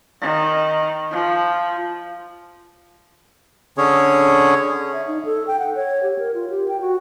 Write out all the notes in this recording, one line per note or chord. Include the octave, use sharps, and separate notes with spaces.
D#3
F3
D3 C#4 G#4 C#5
E5
D#4
A4
G5
F#5
C#5
G4
A#4
F4
G4
G5
F#4